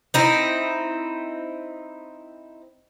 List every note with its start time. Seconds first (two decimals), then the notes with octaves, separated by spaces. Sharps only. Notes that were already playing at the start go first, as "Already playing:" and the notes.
0.14 C4 D#4 E4